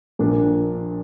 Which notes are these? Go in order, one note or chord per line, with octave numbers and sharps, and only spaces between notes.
A#1 A#2 A#3 D4